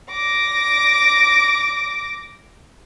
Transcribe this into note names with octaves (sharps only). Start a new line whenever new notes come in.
D6 A#6